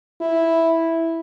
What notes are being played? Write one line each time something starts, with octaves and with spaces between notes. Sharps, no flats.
E4